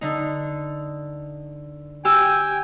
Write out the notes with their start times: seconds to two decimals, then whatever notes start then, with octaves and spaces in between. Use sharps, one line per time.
0.01 D3 D#4
2.05 G4 G5 G#5 E6